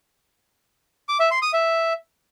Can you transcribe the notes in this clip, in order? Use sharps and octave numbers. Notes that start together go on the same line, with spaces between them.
D6
E5
C6
D#6
E5